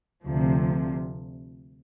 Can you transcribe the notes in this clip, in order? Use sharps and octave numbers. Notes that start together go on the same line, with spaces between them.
D2 C3 F3